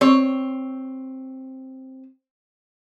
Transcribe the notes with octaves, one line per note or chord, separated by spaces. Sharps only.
C4 C#5